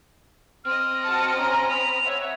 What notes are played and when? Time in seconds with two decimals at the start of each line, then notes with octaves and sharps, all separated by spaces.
0.65 C4 D#5 F6
1.03 F#4 A5 C#7
1.37 C#4 A#5
1.69 B5 F7
2.03 C#5 E5 F#5